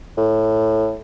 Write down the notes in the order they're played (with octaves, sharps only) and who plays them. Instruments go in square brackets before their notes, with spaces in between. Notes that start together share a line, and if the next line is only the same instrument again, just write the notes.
[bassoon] A2